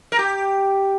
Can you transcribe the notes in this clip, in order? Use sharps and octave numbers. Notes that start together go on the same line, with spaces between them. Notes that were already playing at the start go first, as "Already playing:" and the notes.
A#4
G4